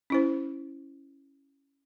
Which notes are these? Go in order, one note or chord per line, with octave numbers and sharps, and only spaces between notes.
C#4 E4 C5